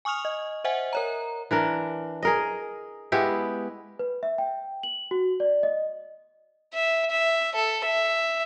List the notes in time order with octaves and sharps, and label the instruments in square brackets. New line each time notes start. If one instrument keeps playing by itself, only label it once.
[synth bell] G#5 C#6 D#6 F6 F7
D#5
C5 D#5 E5 F#5 G#5
A#4 C#5 A#5
[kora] E3 D4 A#4
G#4 A#4 D#5
G#3 B3 E4 G4
[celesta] B4
E5
G5
F#7
F#4
D5
D#5
[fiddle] E5
E5
A4
E5